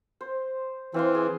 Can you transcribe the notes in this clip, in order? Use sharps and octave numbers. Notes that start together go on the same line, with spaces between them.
C5
E3 C4 F5 C6
G#4